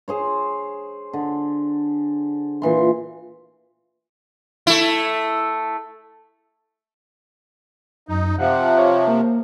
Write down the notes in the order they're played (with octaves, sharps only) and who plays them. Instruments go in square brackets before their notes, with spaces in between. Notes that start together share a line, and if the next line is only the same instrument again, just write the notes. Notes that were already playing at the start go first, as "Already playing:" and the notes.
[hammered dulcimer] G#4 C5 C#5
D3
A#2 E3 C6
[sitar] A3 E4
[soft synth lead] F#2 [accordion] D#4
[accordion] C3 F3 [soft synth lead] F#5
[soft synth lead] C#5
A#3